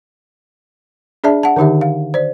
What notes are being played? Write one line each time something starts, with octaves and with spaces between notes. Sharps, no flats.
D4 G#4 D5 E5 A5
F#5 A5
D3 D#3 D#4 G4 E5
F5
C5 D5